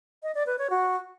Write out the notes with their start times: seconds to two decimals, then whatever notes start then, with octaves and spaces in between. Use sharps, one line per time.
0.23 D#5
0.35 D5
0.47 B4
0.58 C#5
0.70 F#4